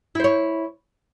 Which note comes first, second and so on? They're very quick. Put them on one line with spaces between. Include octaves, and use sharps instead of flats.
E4 C5 C#5